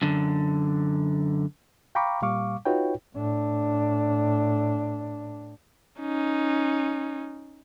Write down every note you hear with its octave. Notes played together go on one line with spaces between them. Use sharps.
F#2 D3
F5 G5 A#5 B5 C#6 D6
A#2 G3 F5 C#6 D6
D#4 F4 F#4 B4 C#5 G5
A2 D4
C#4 D#4